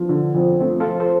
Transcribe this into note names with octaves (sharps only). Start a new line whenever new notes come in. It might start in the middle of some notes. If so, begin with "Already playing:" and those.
Already playing: F3 B3 D4
D3
F2
F3 A3 C4
F4 A4
F2
A4 C5